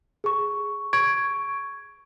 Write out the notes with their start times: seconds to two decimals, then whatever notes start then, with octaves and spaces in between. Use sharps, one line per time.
0.24 G#4 C#6
0.93 C#6 G#6 D7